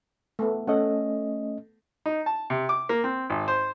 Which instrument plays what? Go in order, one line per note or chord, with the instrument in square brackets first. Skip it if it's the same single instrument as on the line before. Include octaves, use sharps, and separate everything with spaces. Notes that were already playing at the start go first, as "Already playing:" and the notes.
[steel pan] A3 B3
[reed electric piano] A3 C#4 D#5 [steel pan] A4 F#5
[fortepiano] D#4
A5
C3
D6
A#3
C4
G#1
C5